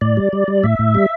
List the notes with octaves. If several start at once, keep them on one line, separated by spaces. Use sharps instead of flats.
A2 D5
G3
G3
G3
A2 E5
A2
G3